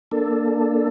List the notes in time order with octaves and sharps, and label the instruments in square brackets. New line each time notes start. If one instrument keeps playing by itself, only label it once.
[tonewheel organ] A#3 D4 A4